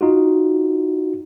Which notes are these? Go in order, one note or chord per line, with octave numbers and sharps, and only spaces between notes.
D#4 F4 F#4